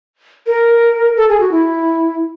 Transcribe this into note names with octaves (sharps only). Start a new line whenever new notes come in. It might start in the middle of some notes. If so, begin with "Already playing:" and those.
A#4
A4
G#4
F#4
E4